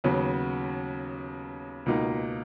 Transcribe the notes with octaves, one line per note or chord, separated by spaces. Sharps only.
D#2 C#3 F#3 B3
C#2 B2 A#3 D#4